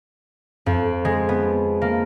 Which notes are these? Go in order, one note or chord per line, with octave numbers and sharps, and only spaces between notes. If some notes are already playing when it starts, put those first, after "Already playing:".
F2
G#3
B3
A#3